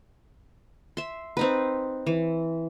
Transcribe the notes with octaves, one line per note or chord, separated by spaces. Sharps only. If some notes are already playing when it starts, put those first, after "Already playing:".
E5 C6
C4 D#4 B4
E3